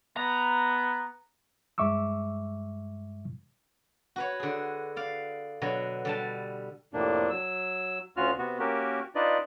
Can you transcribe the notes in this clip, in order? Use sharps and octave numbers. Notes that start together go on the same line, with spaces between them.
B3 A#5
G2 G#3 E5 C#6 D6 E6
F#4 B4 C#5
D3 G#4
D5 F5
B2 D3 F#3
D3 G3 A5
F2 A2 C3 A#3 D4
F#3 E6
D2 C#4 F4 F#4 F6
C3 B3 F#4
A#3 C#4 F#4 G4 A#4
D4 D#4 F4 B4 D5 D#5